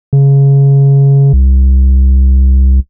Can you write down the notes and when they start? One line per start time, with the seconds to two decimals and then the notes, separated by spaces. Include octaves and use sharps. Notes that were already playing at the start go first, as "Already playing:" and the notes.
0.13 C#3
1.33 C2